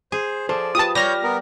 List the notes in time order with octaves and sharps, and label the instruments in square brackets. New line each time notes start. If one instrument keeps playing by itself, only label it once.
[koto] G#4 [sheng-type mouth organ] C5
[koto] F3 [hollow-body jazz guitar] A4 C5 [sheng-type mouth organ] D5
[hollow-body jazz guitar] F4 G4 B4 [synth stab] A5 D#6
[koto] G3 [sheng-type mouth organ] C#5 G6 [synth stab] F6 A#6
[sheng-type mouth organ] B3 A#4